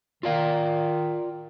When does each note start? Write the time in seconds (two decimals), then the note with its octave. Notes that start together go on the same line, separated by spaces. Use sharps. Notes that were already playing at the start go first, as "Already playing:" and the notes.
0.23 D#3 F4 D5 F5